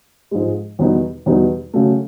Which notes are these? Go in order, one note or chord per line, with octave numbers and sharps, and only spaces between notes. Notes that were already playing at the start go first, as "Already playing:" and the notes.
G#2 F3 G#3
E2 B2 G3 B3 D#4
E2 B2 G3 B3 D#4
C#3 F#3 A3